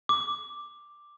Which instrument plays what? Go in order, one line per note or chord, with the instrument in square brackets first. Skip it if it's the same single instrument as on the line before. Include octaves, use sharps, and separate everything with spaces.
[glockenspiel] D6